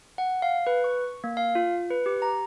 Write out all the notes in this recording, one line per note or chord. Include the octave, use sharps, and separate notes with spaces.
F#5
F5
B4
C#6
A#3
F5
F4
B4
G4
A#5